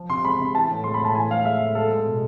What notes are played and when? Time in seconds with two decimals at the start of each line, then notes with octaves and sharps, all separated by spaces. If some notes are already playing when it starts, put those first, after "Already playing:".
Already playing: F3
0.09 C3 C6
0.24 G#3 B5
0.40 C3
0.55 E3 A5
0.70 A2
0.84 G#3 C6
0.94 B5
1.01 A2 A5
1.15 E3 G#5
1.30 A2 F5
1.45 G#3 E5
1.60 A2
1.75 G#3 A4
1.90 G#3
2.06 B2